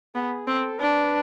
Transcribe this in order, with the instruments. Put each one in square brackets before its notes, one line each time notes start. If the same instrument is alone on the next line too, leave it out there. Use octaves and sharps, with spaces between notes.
[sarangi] B3 [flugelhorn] G#4
[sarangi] C4 [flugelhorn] A4
[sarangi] D4 [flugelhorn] B4